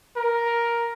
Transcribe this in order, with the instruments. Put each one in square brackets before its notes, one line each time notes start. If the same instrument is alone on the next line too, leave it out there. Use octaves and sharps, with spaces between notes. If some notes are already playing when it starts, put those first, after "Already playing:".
[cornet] A#4